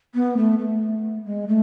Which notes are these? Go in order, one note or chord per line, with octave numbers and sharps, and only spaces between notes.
B3
A3
A3
G#3
A3